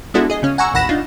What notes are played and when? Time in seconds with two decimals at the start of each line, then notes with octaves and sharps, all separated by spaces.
0.14 G#3 B3 D4 E4 F#4 A4
0.30 G#4 D#5
0.43 C#3 C#4
0.58 F#5 G#5 A#5 C#6 E6
0.74 A1 D#2 F#5 B5 A#6 E7
0.89 D4 D#4 F4